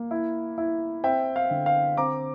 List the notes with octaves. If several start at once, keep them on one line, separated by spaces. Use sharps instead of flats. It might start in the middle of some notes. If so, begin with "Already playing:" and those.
Already playing: A#3
E4
E4
C4 E5 G5
F5
D3
F5
C4 A#5 D6